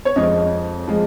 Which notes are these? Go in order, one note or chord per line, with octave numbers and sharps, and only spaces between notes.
C#5
F2 F3 G#3 D#5
F3 G#3